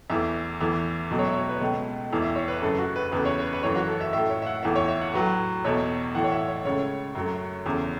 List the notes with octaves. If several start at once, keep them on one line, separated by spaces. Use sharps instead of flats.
E2 E3 A3 E5
E2 E3 A3
C#2 B2 F#3 A3
C#5
E5
C#5
B4
C#2 B2 A3
E2 E3 A3
E5
C#5
B4
F#2 C#3 A3 A4
F#4
B4
E2 C#3 A3 B4
C#5
B4
B4
F#2 E3 A3 C#5
F#4
A4
E5
A2 A3 E5
C#5
E5
F#5
E2 E3 A3 E5
C#5
E5
F#5
A2 F#3 A3 B4
E2 B2 A3 C#5
A2 E3 A3 F#5
C#5
E5
C#5
C#2 C#3 A3 C#5
F#2 F#3 A3
E2 C#3 A3